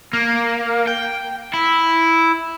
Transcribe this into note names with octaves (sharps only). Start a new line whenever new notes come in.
A#3
G5
E4